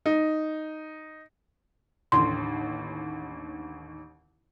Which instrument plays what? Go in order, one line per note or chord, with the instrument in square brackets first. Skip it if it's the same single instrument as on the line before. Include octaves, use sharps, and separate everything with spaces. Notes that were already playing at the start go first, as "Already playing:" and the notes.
[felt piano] D#4
[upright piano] A1 D#2 D3 [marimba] C6